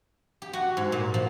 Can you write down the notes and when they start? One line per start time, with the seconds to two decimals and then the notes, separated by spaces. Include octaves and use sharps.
0.42 G4
0.53 F#4
0.77 G#2
0.92 A#2
1.14 F3